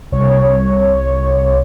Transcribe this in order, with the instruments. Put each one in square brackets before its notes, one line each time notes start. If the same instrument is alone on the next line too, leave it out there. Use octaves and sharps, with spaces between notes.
[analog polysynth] C2 C#5